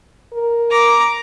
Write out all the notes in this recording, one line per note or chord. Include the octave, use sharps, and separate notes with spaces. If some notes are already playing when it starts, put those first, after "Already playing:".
A#4
A#5 D6